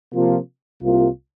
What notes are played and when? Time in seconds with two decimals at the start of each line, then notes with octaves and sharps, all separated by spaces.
0.13 C3 F3 A#3 F4
0.82 C2 C3 A#3 F4